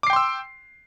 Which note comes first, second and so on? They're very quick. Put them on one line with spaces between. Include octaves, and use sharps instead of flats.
D6 C7 G5 C6 E6